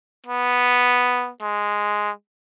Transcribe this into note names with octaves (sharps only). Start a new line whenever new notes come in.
B3
G#3